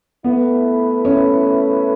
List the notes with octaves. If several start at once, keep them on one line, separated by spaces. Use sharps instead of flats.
A3 B3 E4 B4
C#4